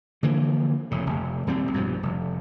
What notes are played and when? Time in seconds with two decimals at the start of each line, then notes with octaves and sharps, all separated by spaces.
0.23 D3 E3 F3 A#3
0.91 F1 A2
1.07 F1
1.47 D#1 G3 C4
1.73 A#1 G2 B2 F3
2.03 F1